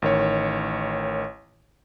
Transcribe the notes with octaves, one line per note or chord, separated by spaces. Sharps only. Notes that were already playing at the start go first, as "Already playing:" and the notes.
A1 D#3 C#5